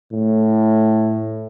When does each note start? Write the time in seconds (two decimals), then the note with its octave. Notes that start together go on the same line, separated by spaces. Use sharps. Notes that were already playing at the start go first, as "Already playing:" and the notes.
0.12 A2